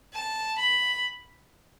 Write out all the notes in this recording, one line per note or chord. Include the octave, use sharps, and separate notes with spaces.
A5
B5